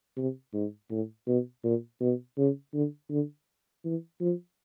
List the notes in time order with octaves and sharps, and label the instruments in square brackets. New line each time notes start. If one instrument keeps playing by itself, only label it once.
[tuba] C3
G#2
A2
B2
A#2
B2
C#3
D3
D3
E3
F3